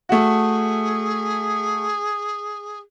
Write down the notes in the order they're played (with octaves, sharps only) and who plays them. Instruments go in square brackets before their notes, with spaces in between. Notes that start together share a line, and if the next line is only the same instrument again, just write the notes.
[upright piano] A3 F#4 [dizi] G#4